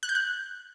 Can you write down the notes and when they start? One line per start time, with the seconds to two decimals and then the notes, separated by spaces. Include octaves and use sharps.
0.03 F#6
0.09 G6
0.15 F#6